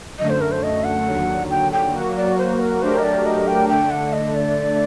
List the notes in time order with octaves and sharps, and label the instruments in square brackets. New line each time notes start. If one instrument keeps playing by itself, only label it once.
[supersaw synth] F#2 D3 A3 [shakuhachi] D#5
[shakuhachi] C5
A#4
C5
D#5
F#5
[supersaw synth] D#2 D3 F#3
[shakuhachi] G5
G5
[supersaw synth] F#3 A#3 F#4
[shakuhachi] D5
C5
A#4
[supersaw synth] F#3 A3 D4 G4 A#4 [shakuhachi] C5
[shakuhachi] D#5
D5
D#5
G5
[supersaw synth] D3 A3 D4 [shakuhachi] G5
[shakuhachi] F#5
D#5
D5